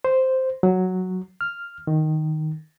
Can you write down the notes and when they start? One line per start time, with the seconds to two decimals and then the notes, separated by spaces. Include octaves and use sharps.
0.05 C5
0.63 F#3
1.41 F6
1.87 D#3